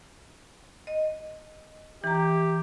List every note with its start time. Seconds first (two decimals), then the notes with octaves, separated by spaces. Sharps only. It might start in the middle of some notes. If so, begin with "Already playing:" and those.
0.87 D#5
2.04 E3 G4 A#5